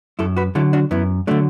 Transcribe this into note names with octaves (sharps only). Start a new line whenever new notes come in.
F#2 E4 A4
F#4 B4
D3 F#3 E4 A4
D4 F#4
F#2 B3 E4
D3 F#3 A3 D4